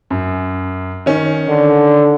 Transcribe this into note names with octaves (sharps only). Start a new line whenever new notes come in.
F#2
D#3 C#4
D3